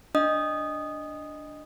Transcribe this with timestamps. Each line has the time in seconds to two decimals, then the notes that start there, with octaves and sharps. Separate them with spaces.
0.15 D4 D#5 D#6